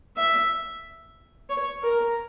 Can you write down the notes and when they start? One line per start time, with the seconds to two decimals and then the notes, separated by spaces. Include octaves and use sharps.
0.16 E5
1.50 C#5
1.83 A#4